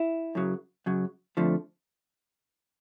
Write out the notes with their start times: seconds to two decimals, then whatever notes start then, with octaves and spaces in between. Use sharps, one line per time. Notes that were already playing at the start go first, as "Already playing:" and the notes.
Already playing: E4
0.35 F#2 C#3 F#3
0.86 F#2 C#3 F#3
1.37 F2 D3 F3 A3